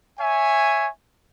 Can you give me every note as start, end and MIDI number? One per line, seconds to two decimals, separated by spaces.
0.19 0.87 73
0.19 0.87 76
0.19 0.87 80